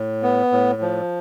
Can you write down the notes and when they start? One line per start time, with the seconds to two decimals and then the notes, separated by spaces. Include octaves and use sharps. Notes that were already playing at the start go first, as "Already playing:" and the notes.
Already playing: A2
0.22 B3
0.52 A2
0.82 F3